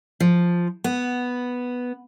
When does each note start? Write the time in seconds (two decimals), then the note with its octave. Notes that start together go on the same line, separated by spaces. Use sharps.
0.20 F3
0.84 B3